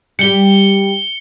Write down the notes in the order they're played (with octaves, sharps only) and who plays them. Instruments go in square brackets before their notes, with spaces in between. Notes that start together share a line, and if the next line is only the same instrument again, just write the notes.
[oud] G3 G4 [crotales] C#7 G7